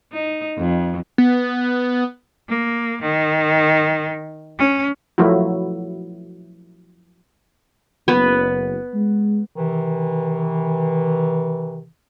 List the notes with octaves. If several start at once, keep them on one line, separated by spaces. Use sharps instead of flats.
D#4
F2
B3
A#3
D#3
C#4
F3 F#3 A3 E4 F#4
F#1 B3 B4
G#3
C3 D#3 E3